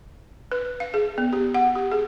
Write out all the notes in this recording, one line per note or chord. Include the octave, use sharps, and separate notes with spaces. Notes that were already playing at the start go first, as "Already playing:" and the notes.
B4
F5
G#4
B3
G4
F#5
G4
G#4